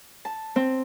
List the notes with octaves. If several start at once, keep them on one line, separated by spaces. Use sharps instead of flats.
A5
C4